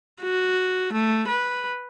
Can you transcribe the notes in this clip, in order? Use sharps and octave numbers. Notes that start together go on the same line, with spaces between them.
F#4
A3
B4